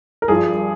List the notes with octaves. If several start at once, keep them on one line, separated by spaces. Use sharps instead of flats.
A#4
G2 F3 G#4